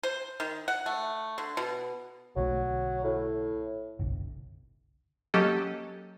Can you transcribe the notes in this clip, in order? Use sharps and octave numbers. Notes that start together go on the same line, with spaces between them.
C5
D#3
F#5
A3
D3
B2
B1 D3 F#3 A3
A2
F#1 B1 D3
F#3 A#3 C#4 G4 A4 D#5